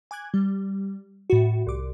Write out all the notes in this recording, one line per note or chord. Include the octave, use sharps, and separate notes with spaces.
G#5 D6 F#6 G#6
G3
A2 F#4
C2 D6